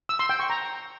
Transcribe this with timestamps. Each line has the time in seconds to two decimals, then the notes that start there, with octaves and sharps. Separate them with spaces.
0.09 E6
0.19 C6
0.29 G5
0.40 C#6
0.50 A#5